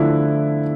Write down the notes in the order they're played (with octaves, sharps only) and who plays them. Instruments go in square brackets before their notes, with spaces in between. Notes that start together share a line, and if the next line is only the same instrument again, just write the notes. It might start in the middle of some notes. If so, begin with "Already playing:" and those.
Already playing: [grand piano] D3 F3 A3 D4 [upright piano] E4